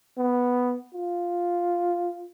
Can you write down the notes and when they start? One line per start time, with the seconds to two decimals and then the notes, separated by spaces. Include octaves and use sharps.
0.18 B3
0.94 F4